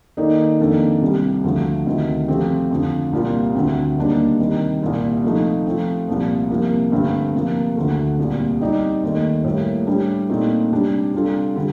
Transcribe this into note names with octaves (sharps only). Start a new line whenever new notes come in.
D#3 A#3 D#4 A4 D5
F2 D#3 A#3 D4 A4
C2 C3 G3
D2 D3 F3 A3
D2 C3 D#3
C3 F3 A3 C4 G4
F2 D3 F3
C2 A#2 G3 A#3 F4
D2 D3 A3 C4
D#2 D#3 G3 A#3 D4
C3 D#3 G3
C2 A#2 G3
C3 F3 A3 D#4
F3 A3 C4
C2 A#2 F3
C2 C3 F3 A#3
G2 D3 A3 C4
C3 F3 A#3
D2 D3 A3
C2 A#2 G3
G3 C4 D#4 G4 D5
D#2 D#3 A3
A2 G3 A#3
A2 G3 D4
A#2 A3 C4 D#4
C3 G3 D4
C3 G3 D4 F4 A4
D3 G3